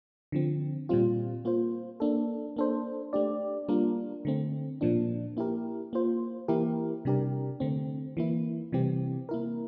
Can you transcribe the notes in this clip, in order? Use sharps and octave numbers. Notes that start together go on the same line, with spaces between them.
D3 F3 C4
A#2 G3 C4 F4
A#3 F4 C5
A#3 D4 A4
A#3 D4 A4 C5
A3 D4 G4 D5
G3 A#3 D4 F4 A#4
D3 A3 C4
A#2 F3 A#3 D4
A#3 E4 G4 A#4
A#3 F4 C5
E3 A#3 E4 G4 A#4
C3 G3 D4 G4 A#4
D3 A3 C4
E3 A#3 E4
C3 E3 G3 C4 G4
A#3 E4 A#4